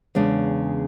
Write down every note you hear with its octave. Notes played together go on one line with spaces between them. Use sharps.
E2 C#3 G#3 D4